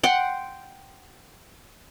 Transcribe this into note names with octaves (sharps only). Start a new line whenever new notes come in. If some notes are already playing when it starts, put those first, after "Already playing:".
F#5 G5 C6